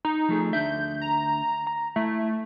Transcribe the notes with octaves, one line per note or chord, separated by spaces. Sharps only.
D#4
F3 A3 G#4
D2 D4 E5 G6
A#5
A#5
A3 E4